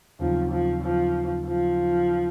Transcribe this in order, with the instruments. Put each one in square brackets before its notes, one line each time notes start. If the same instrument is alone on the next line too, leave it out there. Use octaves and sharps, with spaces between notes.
[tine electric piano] D#2 C#3 F#3 C4 D#4 [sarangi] F3
[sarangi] F3
F3
F3